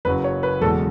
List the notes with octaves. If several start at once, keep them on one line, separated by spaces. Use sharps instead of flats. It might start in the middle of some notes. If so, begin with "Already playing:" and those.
F#1 F#2 C#3 F#3 B4
C#5
B4
F#1 E2 B2 G#3 A4